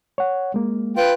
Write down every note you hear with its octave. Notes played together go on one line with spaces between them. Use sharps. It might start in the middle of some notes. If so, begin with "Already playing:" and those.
C#5 F#5
G#3 A#3
F4 B4 G5